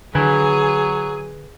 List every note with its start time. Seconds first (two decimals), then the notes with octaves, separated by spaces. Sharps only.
0.15 D3 F#3 G#4 B4 G5 G#5